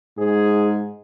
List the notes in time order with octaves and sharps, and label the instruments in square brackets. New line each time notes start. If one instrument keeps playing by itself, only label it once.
[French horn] G#2 [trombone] G#4